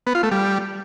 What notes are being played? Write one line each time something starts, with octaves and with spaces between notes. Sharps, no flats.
B3
F4
A3
G3